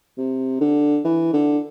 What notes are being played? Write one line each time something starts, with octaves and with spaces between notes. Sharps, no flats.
C3
D3
E3
D3